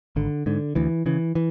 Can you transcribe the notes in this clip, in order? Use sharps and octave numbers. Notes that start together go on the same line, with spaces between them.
G#1 D3
G#2 D3
D2 E3
C#3 E3
E3